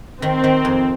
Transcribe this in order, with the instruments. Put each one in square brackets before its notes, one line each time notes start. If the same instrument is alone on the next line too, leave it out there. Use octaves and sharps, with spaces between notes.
[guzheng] D#3 [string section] C4
[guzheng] D#3
F2